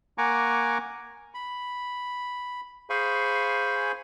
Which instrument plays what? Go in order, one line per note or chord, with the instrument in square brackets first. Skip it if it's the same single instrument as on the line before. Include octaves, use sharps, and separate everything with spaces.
[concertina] A#3 F#5 G#5 A#5 C#6 D6
B5
G#4 C5 F5 G#5 B5 C#6